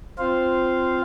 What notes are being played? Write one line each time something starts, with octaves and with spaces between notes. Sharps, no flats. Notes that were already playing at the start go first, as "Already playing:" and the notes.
C4 F4 C5 F5